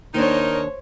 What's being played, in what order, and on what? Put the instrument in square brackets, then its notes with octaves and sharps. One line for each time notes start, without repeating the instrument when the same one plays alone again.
[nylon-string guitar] D#2 D4 [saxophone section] D#4 A#4 [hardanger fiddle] C5 C#5